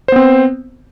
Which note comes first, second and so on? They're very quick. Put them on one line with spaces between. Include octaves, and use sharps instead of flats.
C5 B3 C4